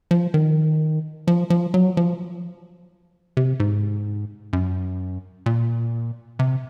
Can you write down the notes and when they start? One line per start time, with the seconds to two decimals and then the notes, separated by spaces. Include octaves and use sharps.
0.11 F3
0.34 D#3
1.28 F3
1.50 F3
1.74 F#3
1.97 F3
3.37 C3
3.60 G#2
4.53 F#2
5.46 A#2
6.39 C3